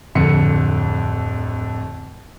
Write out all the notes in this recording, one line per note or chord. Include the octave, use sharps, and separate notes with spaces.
D1 F2 D3 C#7